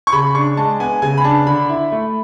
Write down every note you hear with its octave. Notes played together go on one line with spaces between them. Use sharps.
C#6
C#3 B5
D4 C#6
G#3 A5
B3 G#5
C#3 G#5
B5
D4 A5
D3 B5
E4
A3